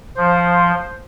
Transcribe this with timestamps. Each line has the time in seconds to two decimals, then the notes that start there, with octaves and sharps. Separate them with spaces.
0.17 F3 C5